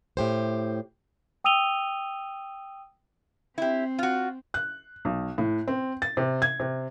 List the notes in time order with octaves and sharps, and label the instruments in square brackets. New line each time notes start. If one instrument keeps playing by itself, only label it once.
[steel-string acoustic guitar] A2 G4 C5
[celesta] G5 D#6 E6 D#7 F7 G7
[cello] C4 [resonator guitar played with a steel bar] E4 G4
[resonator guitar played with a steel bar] F4 F#4
[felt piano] F#6
B1
A2
C4
A6
C3
G#6
C3